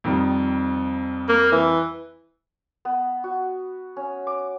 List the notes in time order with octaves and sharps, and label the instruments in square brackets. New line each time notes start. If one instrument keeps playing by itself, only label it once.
[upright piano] F2 D#3 G3
[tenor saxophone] A#3
E3
[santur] B3
F#4
C#4
D6